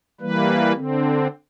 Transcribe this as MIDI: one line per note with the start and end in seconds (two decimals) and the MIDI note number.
0.21 0.73 52
0.21 0.73 55
0.21 0.73 58
0.21 0.73 71
0.75 1.27 50
0.75 1.27 60